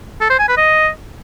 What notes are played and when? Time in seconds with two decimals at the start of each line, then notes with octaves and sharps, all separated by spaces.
0.21 A4
0.30 C5
0.39 G#5
0.48 B4
0.57 D#5